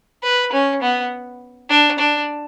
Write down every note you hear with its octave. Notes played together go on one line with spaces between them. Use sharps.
B4
C#4
B3
D4
D4